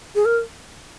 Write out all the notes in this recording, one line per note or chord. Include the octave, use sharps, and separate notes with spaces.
G#4
A#4